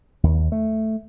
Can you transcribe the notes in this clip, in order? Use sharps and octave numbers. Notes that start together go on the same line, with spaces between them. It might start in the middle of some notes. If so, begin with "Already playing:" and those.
D#2
A3